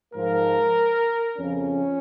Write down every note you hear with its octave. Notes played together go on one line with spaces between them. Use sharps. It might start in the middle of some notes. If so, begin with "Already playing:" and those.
G#2 F3 A#4
F2 C#3 F3 C#4